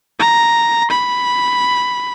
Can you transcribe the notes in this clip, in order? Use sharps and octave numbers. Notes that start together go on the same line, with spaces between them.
A#5
B5